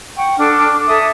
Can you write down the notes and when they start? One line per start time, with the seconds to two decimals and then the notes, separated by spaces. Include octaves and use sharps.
0.16 F#5 G5 C#6
0.37 D4 A4 D6 F6
0.87 A4 E5 G#5 D#6